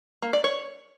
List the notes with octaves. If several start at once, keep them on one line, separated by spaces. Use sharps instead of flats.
A#3
D5
C#5